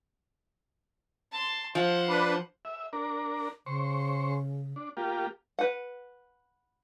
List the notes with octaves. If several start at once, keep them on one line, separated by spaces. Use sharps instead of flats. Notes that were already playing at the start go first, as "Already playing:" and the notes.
A5 C6
F3 C5 F#5
D4 B4
E5
D4 A#4
C#3 C5 C#6
D4
A#3 F4 G4
B4 F#5